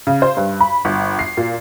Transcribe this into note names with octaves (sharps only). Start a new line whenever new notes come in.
C#3
C5
G2
B5
G1
C7
A#2